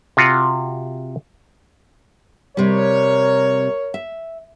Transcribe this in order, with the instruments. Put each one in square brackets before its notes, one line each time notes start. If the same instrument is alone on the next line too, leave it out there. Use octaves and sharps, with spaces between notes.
[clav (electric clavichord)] C3 F4 F#4
[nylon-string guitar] C3 G3 [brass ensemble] A#4 C#5
[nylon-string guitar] E5